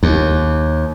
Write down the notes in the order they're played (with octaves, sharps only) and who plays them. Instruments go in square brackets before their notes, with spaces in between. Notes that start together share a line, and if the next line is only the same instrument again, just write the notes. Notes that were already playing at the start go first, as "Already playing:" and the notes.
[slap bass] D#2